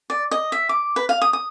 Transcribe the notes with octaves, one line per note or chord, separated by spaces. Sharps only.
D5
D#5
E5
D6
B4
F5
D#6
D#6